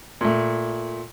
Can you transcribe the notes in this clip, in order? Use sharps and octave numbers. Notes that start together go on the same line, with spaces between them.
A#2 A3